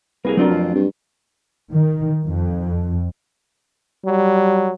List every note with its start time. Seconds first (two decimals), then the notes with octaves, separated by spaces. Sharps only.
0.25 C2 A#3 G#4 A#4 B4
0.37 F#3 A3 C4 D4 F4 A#4
0.50 F2
0.75 G2
1.71 D#3
2.26 F2
4.05 F#3 G3